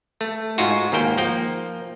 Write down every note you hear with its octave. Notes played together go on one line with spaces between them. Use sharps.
A3
G#2 G#3 F4 F#4
D#2 G#2 A#3 G5
F3 A#3 G5